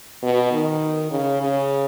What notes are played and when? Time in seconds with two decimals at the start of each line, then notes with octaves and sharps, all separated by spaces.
0.23 B2
0.52 D#3
1.11 C#3
1.41 C#3